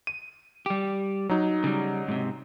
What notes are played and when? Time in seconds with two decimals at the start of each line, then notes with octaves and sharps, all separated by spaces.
0.07 D#7
0.66 G3 G4
1.29 F#3 D#4
1.64 C#3 G3
2.08 G#2 C3